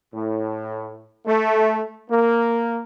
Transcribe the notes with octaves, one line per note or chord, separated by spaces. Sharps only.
A2
A3
A#3